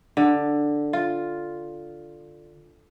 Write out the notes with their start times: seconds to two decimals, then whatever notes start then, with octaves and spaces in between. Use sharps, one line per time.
0.17 D3
0.93 F4